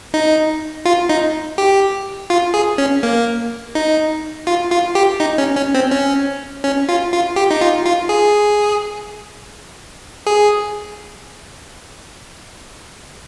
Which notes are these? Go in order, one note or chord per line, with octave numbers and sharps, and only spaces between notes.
D#4
F4
D#4
G4
F4
G#4
C#4
A#3
D#4
F4
F4
G4
D#4
C#4
C#4
C4
C#4
C#4
F4
F4
G4
D#4
F4
F4
G#4
G#4